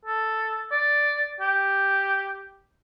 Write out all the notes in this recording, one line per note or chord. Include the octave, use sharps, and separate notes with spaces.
A4
D5
G4